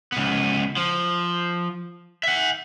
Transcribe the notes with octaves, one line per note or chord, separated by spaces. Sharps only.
C#2 B3
F3
E5 F#5